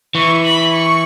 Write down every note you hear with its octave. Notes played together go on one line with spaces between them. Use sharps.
E3 C#6
B5
C#6